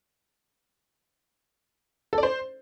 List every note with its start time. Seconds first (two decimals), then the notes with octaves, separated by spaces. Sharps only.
2.13 A4
2.18 D5
2.23 C5